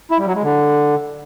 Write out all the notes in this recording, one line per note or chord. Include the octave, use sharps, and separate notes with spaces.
E4
G3
F#3
G#3
D3